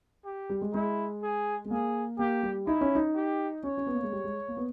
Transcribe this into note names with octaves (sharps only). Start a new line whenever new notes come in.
G4
G3
G#3
G#3 E4
G#4
G#3
A#3 G#4
A#3 G4
G3
D#4 E4
C#4
D#4
G4
C#4 C#5
C#4
B3
A#3
G#3
G3
G#3
A#3
B3